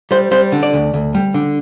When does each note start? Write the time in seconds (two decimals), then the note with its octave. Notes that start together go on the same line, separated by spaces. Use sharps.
0.11 G3 C5
0.31 G3 C5
0.52 D3
0.63 D5
0.74 D2
0.94 D2
1.15 G3
1.34 D3